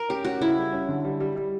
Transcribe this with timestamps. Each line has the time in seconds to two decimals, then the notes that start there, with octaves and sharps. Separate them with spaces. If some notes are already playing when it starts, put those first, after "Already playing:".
Already playing: A#4
0.09 C#4 G4
0.25 C#4 F#4
0.40 C#3 E4
0.56 G3
0.73 C#4
0.89 D3
1.05 G3
1.20 G3
1.36 G3